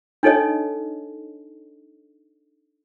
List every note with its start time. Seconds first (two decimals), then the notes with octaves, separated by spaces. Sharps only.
0.23 D4 D#4 A4 C#5 D#5